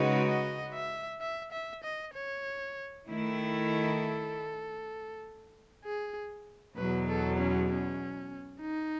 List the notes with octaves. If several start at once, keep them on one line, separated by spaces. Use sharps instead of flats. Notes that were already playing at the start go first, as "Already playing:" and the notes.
Already playing: C#3 G#3 D#4 F#4 B4
D#5
E5
E5
E5
D#5
C#5
D#3 A3 E4
A4
G#4
E2 B2 F#3 B4
A4
C#4
C#4
D#4